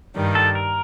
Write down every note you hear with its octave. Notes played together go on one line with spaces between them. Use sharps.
G2 D#3 G3
A4
A#4